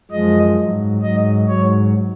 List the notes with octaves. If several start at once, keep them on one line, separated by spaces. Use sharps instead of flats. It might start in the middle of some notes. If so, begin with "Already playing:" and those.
F#2 F3 G#3 D#5
G#2 F#3
G#2 F#3 D#5
G#2 F#3 C#5